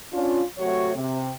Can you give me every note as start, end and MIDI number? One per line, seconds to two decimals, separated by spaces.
0.13 0.43 61
0.13 0.43 62
0.13 0.43 65
0.59 0.91 48
0.59 0.91 54
0.59 0.91 57
0.59 0.91 66
0.59 0.91 73
0.96 1.31 48